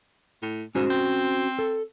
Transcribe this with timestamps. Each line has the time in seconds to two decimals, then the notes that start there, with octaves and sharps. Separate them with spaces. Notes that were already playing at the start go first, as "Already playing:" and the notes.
0.42 A2
0.75 G#2 C#4 F#4 C5
0.90 C4
1.59 A4